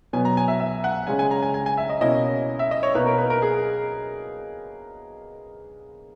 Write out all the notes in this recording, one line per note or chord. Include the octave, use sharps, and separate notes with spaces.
B2 F#3 B3 G#5
A#5
G#5
E5
E5
F#5
C#3 G#3 C#4 G#5
G#5
A#5
G#5
G#5
G#5
E5
D#5
B2 A#3 C#4 E4 D#5
E5
D#5
C#5
B2 A#3 D#4 B4
A#4
B4
A#4
G#4